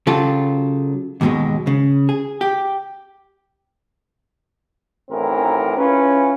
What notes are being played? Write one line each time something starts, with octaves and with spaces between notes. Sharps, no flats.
C#3 F#3 F4 G4 A4
D#2 G#2 B2 F#3 G#3
C#3
G#4
G4
A1 F#2 D#3 E3 C4 A#4
C#4 E4 F4 G#4 B4